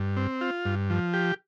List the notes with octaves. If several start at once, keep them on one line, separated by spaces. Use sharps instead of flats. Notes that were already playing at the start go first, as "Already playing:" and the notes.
Already playing: G2
C4
F4
G2
F3
G4